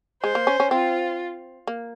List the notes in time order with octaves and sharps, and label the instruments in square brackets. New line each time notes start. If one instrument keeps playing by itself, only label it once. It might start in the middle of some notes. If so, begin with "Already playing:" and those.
[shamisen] G#3 [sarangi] C5
[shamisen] A#3
C#4
C#4
[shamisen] C4 [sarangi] F4
[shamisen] A#3